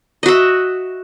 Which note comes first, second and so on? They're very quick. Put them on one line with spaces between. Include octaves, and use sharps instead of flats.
D#5 F#4 E5